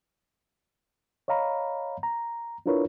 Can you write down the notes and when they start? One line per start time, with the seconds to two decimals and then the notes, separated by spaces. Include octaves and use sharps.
1.28 C#5 D#5 F5 A#5 B5
2.03 A#5
2.66 D4 E4 F4 A#4 B4 C#5